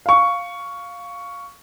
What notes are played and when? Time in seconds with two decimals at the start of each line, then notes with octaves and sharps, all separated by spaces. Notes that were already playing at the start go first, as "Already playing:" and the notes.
0.06 F5 C#6